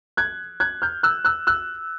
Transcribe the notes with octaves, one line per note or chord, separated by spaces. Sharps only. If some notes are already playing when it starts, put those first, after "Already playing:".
F#6 G#6
F#6 G#6
F6 G6
E6 F#6
E6 F#6
E6 F#6